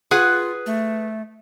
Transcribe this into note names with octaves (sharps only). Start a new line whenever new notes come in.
F4 G#4 B4 F#5
A3